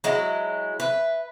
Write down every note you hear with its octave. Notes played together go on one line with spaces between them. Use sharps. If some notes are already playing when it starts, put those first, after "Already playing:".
F#3 G#3 E4
B4 E5